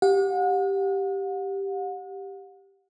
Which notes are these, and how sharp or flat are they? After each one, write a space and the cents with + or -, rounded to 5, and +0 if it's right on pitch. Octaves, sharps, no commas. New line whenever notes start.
G4 +0 F#5 -40